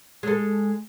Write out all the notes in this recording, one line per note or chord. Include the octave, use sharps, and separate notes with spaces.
G#3 A4